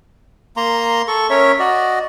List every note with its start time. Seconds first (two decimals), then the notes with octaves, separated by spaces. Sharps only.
0.57 A#3 A#5 C6
1.08 A4 C#6
1.30 C#4 A#4 C#5 E5
1.59 F#4 D5 D#5